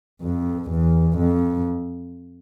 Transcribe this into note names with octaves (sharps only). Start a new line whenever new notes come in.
F2
E2
F2